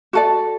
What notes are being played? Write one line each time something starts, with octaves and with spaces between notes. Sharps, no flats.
F#4 A4 D5